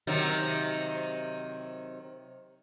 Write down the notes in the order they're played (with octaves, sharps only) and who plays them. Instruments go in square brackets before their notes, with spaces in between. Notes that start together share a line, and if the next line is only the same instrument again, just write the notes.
[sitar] C3 D#3 F#3